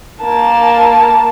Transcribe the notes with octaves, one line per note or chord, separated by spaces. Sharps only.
A#3 A5